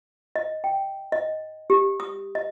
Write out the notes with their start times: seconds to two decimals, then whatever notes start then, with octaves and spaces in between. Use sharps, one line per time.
0.36 D#5
0.64 G5
1.12 D#5
1.70 G4
2.00 D#6
2.35 D#5